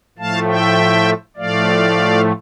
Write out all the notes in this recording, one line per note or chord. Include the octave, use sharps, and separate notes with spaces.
A2 F3 A3 F5 A5
E5 G5
A2 F3 A3 D5 F5